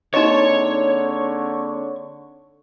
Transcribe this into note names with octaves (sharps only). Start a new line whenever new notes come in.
D3 A#3 C4 D#4 G#4 C#5 D#5